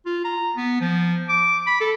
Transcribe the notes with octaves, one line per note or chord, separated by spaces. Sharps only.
F4
A#5
B3
F3
D6
B5
A4